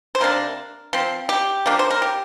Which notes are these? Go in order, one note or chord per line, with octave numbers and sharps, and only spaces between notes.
C5
C3 A#3 D4 A#4
F3 C4
G4
F3 A#3 D4
C5
A#4
G4